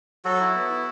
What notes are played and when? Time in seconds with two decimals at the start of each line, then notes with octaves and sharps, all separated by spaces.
0.25 F#3 F#4 A4
0.40 E4
0.55 B3
0.70 E4